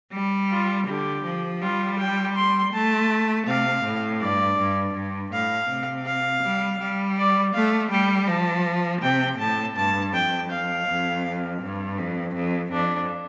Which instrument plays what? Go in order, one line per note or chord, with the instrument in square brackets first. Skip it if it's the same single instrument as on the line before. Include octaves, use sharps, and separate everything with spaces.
[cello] G3
[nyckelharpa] F4
[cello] D3 [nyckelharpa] G4
[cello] F3
[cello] G3 [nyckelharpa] F4
[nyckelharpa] G5
C6
[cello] A3 [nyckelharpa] A5
[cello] C3 [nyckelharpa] F5
[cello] A2
[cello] G2 [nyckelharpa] D5
[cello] G2
G2
[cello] A2 [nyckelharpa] F5
[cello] C3
[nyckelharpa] F5
[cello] G3
G3
[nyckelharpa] D5
[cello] A3 [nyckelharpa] F5
[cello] G3 [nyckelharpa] G5
[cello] F3 [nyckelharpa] A5
[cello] C3 [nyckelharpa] G5
[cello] A2 [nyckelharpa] A5
[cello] G2 [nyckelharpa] A5
[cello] F2 [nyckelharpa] G5
[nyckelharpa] F5
[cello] F2
G2
F2
F2
[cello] F2 [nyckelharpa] D4